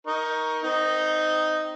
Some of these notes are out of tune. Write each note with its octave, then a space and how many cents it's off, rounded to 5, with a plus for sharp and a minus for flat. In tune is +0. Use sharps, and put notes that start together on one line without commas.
D#4 +20 A#4 +15 C#6 +0
C4 -25 D#4 +0